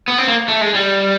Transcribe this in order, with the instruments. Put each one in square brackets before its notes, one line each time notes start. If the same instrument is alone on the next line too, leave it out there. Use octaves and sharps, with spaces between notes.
[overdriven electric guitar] B3
C4
A#3
A3
G#3
G3